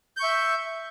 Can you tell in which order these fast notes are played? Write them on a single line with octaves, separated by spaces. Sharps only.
G6 C#6 E5